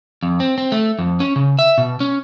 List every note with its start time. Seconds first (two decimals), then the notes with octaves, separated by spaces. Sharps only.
0.23 F2
0.40 C4
0.58 C4
0.72 A3
0.99 F2
1.20 C#4
1.36 C#3
1.59 E5
1.78 B2
2.00 C#4